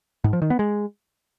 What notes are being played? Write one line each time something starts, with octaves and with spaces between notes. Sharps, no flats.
G#2
F3
D#3
B3
G#3